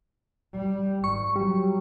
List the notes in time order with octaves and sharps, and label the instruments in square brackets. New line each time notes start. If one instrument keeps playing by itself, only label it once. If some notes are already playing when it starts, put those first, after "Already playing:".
[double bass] G3
[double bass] G#1 [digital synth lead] C#6
[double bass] F#3 [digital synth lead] G3